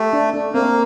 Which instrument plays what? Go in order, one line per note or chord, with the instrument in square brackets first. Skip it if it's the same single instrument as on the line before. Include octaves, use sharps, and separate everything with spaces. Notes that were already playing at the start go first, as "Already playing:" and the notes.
Already playing: [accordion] A3 [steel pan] G4
[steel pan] D4
D4
[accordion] A#3 [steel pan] C4